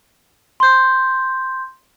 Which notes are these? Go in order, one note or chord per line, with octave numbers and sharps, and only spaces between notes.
C6 G6